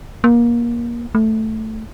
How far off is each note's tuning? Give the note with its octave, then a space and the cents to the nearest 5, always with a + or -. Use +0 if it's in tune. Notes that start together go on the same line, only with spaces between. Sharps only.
A#3 +25
A3 +0